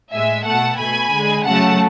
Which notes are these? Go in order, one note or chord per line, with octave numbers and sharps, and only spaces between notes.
A2 G#3 E5 G#5
B2 A3 F#5 A5
B2 A3 G#5 B5
D3 G#3
C#3 F#3 A3 F#5 A5